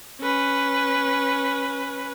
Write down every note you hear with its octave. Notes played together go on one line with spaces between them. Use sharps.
C#4 B4